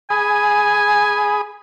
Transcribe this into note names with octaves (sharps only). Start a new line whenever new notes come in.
G#4 G#5 B5 D#6